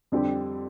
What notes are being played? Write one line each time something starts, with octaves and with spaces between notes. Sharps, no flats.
F2 D3 G3 C4 G4